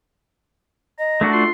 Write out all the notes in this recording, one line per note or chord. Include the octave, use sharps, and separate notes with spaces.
D#5 A#5
A3 D4 F#4
F4 C6